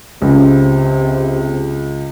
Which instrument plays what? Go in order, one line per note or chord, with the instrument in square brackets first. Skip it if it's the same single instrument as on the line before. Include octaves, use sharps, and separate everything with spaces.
[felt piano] C#2 [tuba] C3